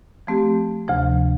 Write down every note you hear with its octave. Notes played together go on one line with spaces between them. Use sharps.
F3 A3 C4 G4
D2 C3 F3